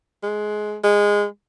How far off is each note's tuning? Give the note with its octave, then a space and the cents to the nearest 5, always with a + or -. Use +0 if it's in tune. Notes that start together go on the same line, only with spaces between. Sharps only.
G#3 +20
G#3 -15